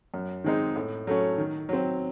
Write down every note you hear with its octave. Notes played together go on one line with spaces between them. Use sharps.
F#2
D#3 G#3 C4 D#4
A2
F#3 A3 C#4
D#3
F#3 C4